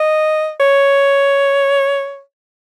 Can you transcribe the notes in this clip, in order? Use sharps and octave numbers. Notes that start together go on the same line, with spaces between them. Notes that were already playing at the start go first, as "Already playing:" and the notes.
Already playing: D#5
C#5